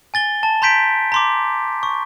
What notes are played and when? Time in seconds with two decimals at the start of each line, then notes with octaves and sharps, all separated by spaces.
0.14 G#5 A6 G7
0.43 A5
0.62 A#5 C6 G6 B6 D7
1.12 A#5 C6 D6
1.83 C#6